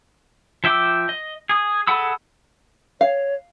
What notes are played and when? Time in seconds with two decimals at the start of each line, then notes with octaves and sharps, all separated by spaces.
0.64 F3 E5 G5 D6 E6
1.09 D#5
1.49 G#4 D#6
1.87 G#4 A4 F#5 B5 E6
3.01 C#5 F5